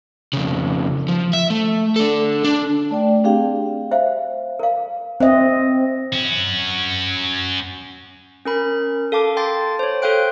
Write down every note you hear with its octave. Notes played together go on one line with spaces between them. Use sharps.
F2 C#3
F3
E5
A3
D4 A4
D4
A3 D5 G5
C4 D4 G4 G#4 F5 G5
C5 E5 F5
A#4 F5
C4 C5 D#5 E5
C#4 F#4
C#4 A#4 B5
A4 F5 A5 D6
G5 C6 D6 A6
C5 C#5
A4 C5 F5 G5 F#6 D7